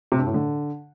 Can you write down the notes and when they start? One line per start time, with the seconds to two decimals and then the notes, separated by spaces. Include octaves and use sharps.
0.12 C3
0.19 G2
0.27 A2
0.34 D3